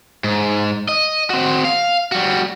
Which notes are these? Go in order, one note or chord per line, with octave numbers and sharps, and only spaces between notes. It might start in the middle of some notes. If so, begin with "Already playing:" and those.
G#2
D#5
C4 F#4
F5
G3 F#4